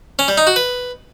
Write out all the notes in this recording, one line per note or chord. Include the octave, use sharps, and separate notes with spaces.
C#4
G3
D#4
F#4
B4